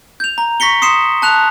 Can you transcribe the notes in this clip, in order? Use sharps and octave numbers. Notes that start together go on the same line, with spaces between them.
G6 F7
A#5
C#6 A#6 B6 C#7 G7
C6 D#6 C7 C#7 E7
A5 F#6 F7